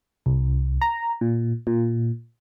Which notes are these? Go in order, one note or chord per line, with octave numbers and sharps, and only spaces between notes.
C2
A#5
A#2
A#2